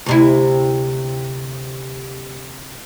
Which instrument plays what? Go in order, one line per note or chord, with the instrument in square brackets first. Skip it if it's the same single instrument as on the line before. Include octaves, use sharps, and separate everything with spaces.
[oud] D2 C3 E4